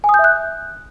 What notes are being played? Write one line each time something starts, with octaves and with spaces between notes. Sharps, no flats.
G#5
D#6
G6
E5
F#6